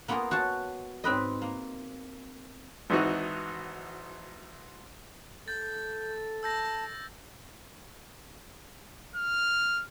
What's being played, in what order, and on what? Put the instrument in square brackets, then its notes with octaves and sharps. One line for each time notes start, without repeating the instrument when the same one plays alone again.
[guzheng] A#3 B3 F4 G#4 A#4
F#4 C#5 F5 A5
G#2 C4 B4 D#5
A#3
[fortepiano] G#1 E3 D#4 F#4
[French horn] A4 [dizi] G6 [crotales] A6
[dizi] A5 [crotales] E6 G6 A#6
[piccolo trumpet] F6